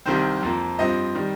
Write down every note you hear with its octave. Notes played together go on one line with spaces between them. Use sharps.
C2 C3 D#3 C4 C5
F2 F3 A#3
G2 F3 C4 D#5
D#3 G3